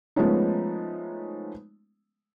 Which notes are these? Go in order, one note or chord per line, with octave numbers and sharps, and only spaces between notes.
F3 G#3 A3 B3 C#4 D#4